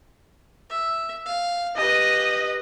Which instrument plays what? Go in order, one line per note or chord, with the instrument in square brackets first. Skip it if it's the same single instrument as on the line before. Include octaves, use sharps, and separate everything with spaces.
[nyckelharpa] E5
F5
[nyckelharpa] G4 B4 [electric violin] D#5